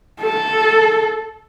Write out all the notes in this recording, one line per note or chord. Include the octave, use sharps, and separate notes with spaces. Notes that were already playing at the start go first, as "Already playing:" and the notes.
A4